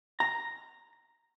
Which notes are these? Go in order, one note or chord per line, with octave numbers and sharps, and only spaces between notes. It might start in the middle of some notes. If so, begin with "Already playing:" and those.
A#5